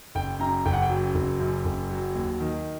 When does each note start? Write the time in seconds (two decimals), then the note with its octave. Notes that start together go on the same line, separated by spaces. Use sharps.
0.15 F#1 G5
0.39 F#2 A#5
0.66 F#1 G5
0.73 F#5
0.82 G5
0.90 F#3
1.15 F#1
1.40 F#2
1.65 F#1
1.90 F#3
2.15 D#2
2.40 D#3